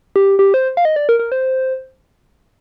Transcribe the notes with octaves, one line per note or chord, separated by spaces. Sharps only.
G4
G4
C5
F5
D#5
D5
A#4
A#4
C5